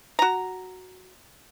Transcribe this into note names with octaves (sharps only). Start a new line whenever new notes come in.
F#4 A#5